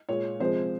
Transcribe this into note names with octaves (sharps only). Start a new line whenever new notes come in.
A#2 G#3 C#5
C3 F3 G#3 C5